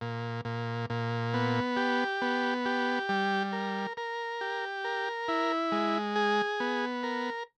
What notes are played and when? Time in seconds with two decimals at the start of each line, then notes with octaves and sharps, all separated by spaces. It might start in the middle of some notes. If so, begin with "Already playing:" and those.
0.01 A#2
0.45 A#2
0.90 A#2
1.34 B3
1.77 G4
2.22 B3
2.65 G4
3.09 G3
3.53 A#4
3.97 A#4
4.41 G4
4.84 A#4
5.28 E4
5.72 G#3
6.16 G#4
6.60 B3
7.03 A#4